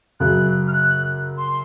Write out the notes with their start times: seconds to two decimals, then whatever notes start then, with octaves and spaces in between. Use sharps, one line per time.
0.20 F#2 C#3 F#3 F#6
0.67 F6
0.72 F#6
1.37 C6